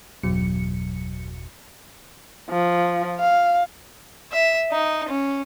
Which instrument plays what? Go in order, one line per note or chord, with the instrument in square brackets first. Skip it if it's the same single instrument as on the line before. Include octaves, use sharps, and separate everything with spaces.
[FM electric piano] G1 E2 B2 F#3 C#7
[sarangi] F3
F5
[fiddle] E5
D#4
C#4